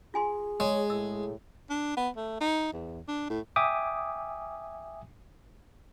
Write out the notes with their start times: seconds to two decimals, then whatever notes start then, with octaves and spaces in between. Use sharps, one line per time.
0.14 F4 G#4 G#5 C6
0.60 G#3 C#5
0.90 A2 E6
1.70 D4
1.97 B3
2.17 A3
2.41 D#4
2.73 E2
3.08 D4
3.30 A2
3.56 E5 G5 G#5 D6 D#6